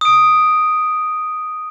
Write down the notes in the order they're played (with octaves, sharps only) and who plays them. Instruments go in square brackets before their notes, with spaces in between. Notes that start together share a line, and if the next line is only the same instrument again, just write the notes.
[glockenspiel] D#6 D7